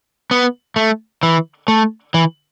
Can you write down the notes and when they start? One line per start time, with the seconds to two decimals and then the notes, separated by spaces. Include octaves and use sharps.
0.31 B3
0.76 A3
1.23 E3
1.68 A3
2.14 E3